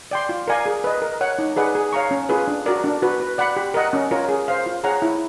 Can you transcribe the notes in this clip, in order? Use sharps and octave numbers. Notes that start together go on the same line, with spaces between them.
D5 G5 C6
F4
A#4 D5 F5 G#5
G#4
B4 D#5
A#4
C#5 F#5
D#4
G#4 B4 D5 F#5
G#4
C#5 F5 A#5 C#6
C#4
F4 G#4 B4
D4
F#4 A#4 D5
D4
F#4 B4
B4
D5 F#5 B5
G4
A#4 D#5 F#5
C#4
F4 A#4 C#5
G#4
C5 F5
F4
G#4 C#5 F#5 A#5
E4